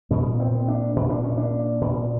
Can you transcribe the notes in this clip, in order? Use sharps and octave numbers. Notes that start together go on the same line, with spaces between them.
A#2 B3
C4
D4
A#2
D4
C#4
D4
A#2